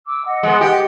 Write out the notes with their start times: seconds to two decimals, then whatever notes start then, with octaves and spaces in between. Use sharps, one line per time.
0.06 D6 E6
0.26 D#5 F#5
0.43 G#3 B3
0.61 G4